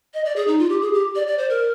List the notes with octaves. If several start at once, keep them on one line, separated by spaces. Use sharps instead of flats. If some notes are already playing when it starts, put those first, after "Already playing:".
D#5
D5
G#4
D#4
F4
G4
G#4
G4
D5
D5
C5
A#4